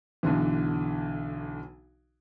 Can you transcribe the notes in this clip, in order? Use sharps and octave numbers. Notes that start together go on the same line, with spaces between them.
B1 D3 E3